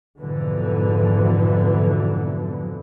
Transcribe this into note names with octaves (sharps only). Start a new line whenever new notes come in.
F2 G#2 B2 D3 E3 F#3